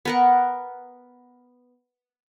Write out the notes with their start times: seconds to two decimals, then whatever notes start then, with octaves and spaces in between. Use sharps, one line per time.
0.05 B3 A#4 F#5